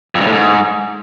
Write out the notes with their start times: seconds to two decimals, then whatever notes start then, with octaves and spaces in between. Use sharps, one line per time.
0.15 F2
0.21 G2
0.27 A2
0.32 G#2